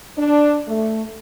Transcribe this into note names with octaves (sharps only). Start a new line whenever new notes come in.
D4
A3